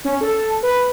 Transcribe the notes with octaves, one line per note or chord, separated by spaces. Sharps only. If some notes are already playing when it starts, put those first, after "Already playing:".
C#4
A4
B4